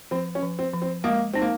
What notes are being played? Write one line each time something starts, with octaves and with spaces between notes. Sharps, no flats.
F3 C4
C#4
F3
C4
F3
C4
G#3 A#3
C4 D#4
A#3